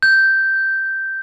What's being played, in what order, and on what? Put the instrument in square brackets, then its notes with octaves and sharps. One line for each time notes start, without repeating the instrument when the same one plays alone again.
[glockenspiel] G6